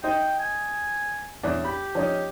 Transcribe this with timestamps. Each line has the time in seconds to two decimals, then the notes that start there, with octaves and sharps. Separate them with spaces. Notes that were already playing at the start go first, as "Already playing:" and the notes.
0.04 D#4 C5 D#5 G5
0.39 G#5
1.43 E2 C#4 D4
1.64 G4 B5
1.95 F3 C#4 D#4